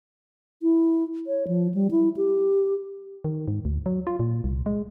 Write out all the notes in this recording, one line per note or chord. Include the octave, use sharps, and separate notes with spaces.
E4
C#5
F3
G3
E4
G4
D#3
G#2
D2
F#3
F4
A#2
C2
G#3